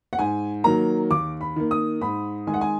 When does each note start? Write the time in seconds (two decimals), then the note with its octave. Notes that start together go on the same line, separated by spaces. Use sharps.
0.13 F#5
0.19 G#2 G#5
0.64 D#3 F#3 A#3 A#5
1.10 D#2 D6
1.41 B5
1.56 D#3 A#3
1.71 D#6
2.01 G#2 B5
2.47 D#3 G#3 G#5
2.54 F#5
2.61 G#5